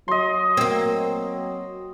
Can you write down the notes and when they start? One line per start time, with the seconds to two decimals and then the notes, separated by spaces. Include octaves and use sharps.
0.08 F#3 D#5 C6
0.57 A#3 C4